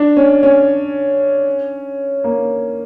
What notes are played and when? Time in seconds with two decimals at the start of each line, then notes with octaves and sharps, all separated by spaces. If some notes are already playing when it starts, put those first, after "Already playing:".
Already playing: D4
0.17 C#4
0.43 C#4
2.24 A#3